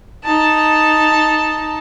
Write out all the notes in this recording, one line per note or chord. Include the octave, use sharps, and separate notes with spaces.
D#4 A5